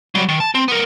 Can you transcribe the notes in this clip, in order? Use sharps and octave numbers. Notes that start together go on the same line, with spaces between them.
F#3 G3
D#3
A5
C4
B3 A#4